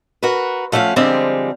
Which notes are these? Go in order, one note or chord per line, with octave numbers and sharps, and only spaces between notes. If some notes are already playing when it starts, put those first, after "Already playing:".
F#4 A#4 B4
F3 A3 C#4 F#4 F5
D3 F3 G3 G#3 C4 F5